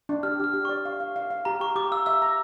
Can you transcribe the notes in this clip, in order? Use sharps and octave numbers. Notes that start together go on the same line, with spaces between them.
D4
G4 F6
G4 F6
G4
D5 C#6
F5
F5
F5
F5
G4 A#5
G4 C#6
G4 D6
F5 E6
E5 E6
A#5